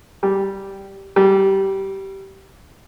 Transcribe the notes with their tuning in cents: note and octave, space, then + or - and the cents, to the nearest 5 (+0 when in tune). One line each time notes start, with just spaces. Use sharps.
G3 -5
G3 -15